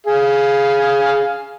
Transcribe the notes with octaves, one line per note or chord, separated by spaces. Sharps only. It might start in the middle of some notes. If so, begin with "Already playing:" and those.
G#4 F5